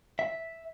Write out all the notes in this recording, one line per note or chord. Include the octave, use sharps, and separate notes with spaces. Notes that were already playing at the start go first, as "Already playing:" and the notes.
E5